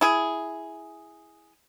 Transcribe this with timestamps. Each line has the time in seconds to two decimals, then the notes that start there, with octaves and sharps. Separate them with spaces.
0.01 E4 G#4